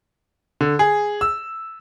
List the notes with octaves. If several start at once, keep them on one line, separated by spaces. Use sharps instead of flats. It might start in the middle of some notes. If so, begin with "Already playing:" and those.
D3
G#4
E6